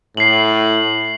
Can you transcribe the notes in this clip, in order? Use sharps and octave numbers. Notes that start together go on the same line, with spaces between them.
A2 C7 F#7